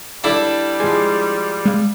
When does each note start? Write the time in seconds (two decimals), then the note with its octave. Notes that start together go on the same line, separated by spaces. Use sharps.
0.24 G3 D4 E4 A4 D5
0.80 F3 G#3 G#5
1.66 G#3 F5